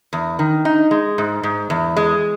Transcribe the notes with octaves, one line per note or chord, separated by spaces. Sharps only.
E2
D#3
D#4
G#3
G#2
G#2
E2
G#3